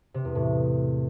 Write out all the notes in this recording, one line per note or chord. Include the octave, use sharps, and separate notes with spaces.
C3
E2
A2